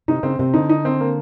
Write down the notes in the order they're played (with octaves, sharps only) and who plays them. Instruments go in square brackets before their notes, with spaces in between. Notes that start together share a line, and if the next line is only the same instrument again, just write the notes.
[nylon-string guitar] C3 [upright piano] D#4
[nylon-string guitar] C#3 [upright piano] C4
[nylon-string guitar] C3 [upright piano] C4
[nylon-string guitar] D3 [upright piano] D#4
[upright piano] D#4
C4
A#3